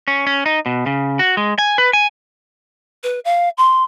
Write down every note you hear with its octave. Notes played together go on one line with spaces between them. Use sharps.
C#4
C#4
D#4
B2
C#3
F#4
G#3
G#5
B4
G#5
B4
F5
C6